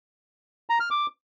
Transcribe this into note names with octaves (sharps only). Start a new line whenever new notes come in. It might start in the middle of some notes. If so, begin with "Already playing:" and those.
A#5
F6
D6